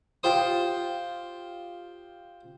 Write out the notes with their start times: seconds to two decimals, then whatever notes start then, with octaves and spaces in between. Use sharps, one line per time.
0.23 F4 G4 C5 D#6